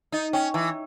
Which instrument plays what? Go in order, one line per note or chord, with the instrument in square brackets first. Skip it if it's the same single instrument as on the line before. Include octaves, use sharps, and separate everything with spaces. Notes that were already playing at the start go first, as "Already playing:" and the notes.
[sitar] D#4 [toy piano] D#5
[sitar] C#4 [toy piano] G5
[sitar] E3 [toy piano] A#5